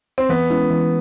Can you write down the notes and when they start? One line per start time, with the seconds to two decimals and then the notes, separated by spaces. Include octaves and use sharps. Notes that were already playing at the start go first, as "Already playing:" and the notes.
0.18 C4
0.29 E3 B3
0.50 G#3 C#4 E4
0.70 E3